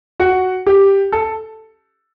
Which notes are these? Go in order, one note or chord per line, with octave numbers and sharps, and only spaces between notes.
F#4 F#5
G4
A4